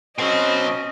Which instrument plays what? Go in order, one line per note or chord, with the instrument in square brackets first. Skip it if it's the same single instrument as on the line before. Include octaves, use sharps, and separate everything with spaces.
[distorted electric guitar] B2 F#3 [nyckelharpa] C#4 [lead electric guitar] C5 G5 [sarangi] D#5